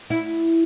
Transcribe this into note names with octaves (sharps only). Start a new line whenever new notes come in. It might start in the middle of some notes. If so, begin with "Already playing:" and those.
E4